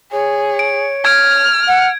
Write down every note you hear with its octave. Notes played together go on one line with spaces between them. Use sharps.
G#4 C#5
D7
F6 G#6 D7
F#5